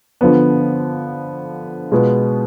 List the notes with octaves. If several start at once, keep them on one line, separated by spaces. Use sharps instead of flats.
D3 F3 B3
B2 G#3 B3 F4